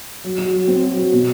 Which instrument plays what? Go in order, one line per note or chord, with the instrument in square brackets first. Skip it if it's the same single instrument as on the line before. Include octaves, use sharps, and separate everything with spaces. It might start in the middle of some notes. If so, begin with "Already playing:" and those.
[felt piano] F#3
F#4
F#3
C4
F#3
F#4
B2